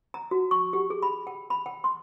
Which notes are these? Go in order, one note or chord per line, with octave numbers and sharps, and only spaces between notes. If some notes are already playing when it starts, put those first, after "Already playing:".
A#5
F#4
C#6
G4
G#4
B5
G5
B5
G5
C6